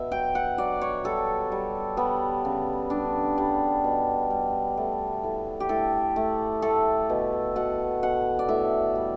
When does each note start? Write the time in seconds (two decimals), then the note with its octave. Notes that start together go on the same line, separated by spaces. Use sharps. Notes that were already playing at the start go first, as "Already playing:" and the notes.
Already playing: B2 E5
0.11 F#3 G5
0.35 F#5
0.58 F#3 D5
0.82 C#5
1.04 G3 A4
1.52 G3
1.97 G3 B3
2.45 C#3
2.90 G3 D4
3.38 G3
3.84 B2
4.30 G3
4.77 A3
5.24 A2
5.60 G4
5.69 A2 A4
6.16 A3
6.62 A3 A4
7.10 B2
7.56 B2 F#5
8.02 B2 F#5
8.39 D5
8.49 A2 E5
8.95 G3